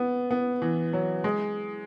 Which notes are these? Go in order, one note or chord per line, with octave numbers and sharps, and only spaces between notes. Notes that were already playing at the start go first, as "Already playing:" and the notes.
Already playing: B3
B3
E3
F#3
G#3